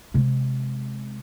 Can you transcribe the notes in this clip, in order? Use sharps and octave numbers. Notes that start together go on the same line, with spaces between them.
C3 G#3